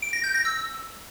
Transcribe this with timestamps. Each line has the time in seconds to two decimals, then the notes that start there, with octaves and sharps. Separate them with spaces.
0.02 D7
0.13 A#6
0.24 G6
0.34 A#6
0.45 E6